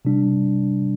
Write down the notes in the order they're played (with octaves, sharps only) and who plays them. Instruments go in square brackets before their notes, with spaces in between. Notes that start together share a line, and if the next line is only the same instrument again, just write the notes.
[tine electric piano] C3 G3 D4